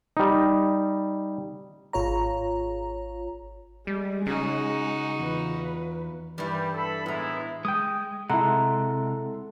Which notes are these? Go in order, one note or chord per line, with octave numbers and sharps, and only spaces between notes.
G3 D#4
G#1 F4 C#5 A#5
G3 G#3
C#3 D#4 F#4
E2 F4 B4
G2 E3 G3
A4 B5
A2 G#3 B3 E4 A#5
G#3 G5 D#6
C3 G#3 E4 A4 F#5 A#5 C6